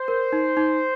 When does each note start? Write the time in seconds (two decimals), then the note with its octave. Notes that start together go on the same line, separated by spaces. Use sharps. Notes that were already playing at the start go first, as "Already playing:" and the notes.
Already playing: C5
0.08 A#4
0.33 D#4
0.57 D#4